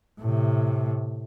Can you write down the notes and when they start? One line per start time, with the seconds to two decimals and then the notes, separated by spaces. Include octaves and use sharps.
0.21 A2 C3